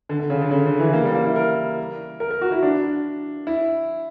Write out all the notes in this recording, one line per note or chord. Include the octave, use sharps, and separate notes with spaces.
D3
D3
C#3
D3
C#3
D3
E3
A#3
G3
A#3
E4
A#4
A#4
A#4
F#4
E4
D4
E4